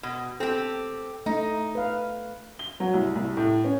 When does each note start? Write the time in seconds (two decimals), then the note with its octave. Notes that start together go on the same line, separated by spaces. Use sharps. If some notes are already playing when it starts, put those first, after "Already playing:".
0.03 B2
0.40 C4 G4 A4
1.26 A3 D#4
1.75 B4 F5
2.59 G7
2.80 F#3
2.94 C2
3.16 C2
3.37 A2
3.65 C#4